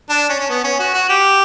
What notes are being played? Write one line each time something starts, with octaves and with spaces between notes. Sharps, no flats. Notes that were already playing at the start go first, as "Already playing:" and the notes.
D4
C#4
C#4
B3
C#4
F#4
F#4
G4